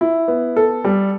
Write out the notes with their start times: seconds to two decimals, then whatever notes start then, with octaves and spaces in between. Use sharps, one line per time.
0.01 E4
0.28 B3
0.56 A4
0.84 G3